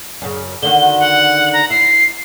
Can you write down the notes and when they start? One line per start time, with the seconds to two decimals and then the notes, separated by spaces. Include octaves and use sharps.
0.22 F#2 C#3
0.62 D3 D#3 F#4 G7
0.99 F#5
1.53 A#5
1.70 E4 C7